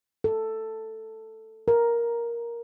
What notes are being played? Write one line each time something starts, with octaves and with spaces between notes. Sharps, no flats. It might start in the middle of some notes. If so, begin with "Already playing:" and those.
A4
A#4